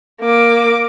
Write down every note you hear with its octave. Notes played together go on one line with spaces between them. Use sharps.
A#3 D6